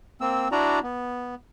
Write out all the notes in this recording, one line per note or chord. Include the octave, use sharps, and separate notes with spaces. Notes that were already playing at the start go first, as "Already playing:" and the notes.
A#3 C4 E6
D4 E4 F#4 D5 A#5
B3